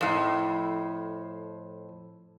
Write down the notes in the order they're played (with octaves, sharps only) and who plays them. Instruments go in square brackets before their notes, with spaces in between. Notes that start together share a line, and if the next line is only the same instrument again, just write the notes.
[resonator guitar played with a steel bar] F2 A2